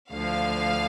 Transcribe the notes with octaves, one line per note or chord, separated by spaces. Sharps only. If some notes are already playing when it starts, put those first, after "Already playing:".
D2 D3 F3 F5